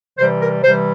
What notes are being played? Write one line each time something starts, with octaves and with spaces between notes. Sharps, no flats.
C3 E3 G3 C5
A#4
C3 E3 G3 C5